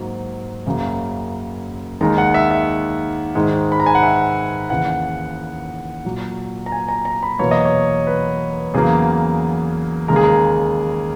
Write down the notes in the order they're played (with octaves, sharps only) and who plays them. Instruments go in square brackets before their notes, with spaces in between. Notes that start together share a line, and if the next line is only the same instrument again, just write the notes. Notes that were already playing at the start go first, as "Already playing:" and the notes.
Already playing: [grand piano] G#2 F#3 A#3
F#2 C#3 F#3 A#3
D#2 D#3 G#3 A#5
F#5
E5
E5
G#2 D#3 G#3
B5
A#5
G#5
F#5
E5
D#2 C#3 E3 F#5
A#2 F#3 A#3
A#5
G#5
A#5
A#5
B5
E2 B2 F#3 A#3 C#5
D#5
C#5
B4
E2 C#3 F#3 A#3 G#4
D#2 C#3 G#3 A#4
G#4
A#4